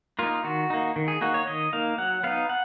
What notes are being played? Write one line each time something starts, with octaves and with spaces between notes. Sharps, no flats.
A#3 D#4 F4
D#3 F#4
A#3 D#4
D#3
G#4
A#3 D#4 F#4
C#5
D#3 D#5
A#3 D#4 F5
F#3 F#5
B3 D#4 F5
F#5